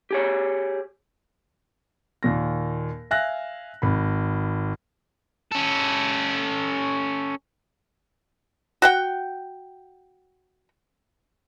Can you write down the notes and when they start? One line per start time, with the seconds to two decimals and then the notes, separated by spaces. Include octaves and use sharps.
0.11 G4 G#4 C#5
2.23 D#2 A#2 A#6
3.11 E5 F5 G#5 F#6 A#6
3.82 G#1 B5
5.52 C#4 A4
8.82 F#4 F#5 G5